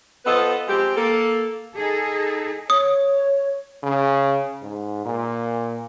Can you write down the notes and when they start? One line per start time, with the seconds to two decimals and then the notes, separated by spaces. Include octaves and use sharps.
0.25 F3 B3 F4 A4 B4 D#5
0.68 F3 G#3 C4 G4
0.97 A#3 A4
1.76 D#4 G#4 A4
2.70 C#5 D#6
3.83 C#3
4.62 G#2
5.06 A#2